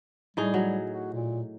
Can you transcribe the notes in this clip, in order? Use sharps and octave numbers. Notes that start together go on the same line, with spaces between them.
A2 G3 D#4 G#4
F#3
F#4
A#2